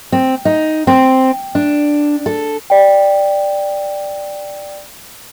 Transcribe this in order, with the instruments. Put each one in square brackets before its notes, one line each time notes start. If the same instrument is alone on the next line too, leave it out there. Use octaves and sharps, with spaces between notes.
[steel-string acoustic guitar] C4
D#4
C4
D4
A4
[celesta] D5 G5